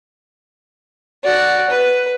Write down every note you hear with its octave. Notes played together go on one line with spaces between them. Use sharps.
F#4 D5
B4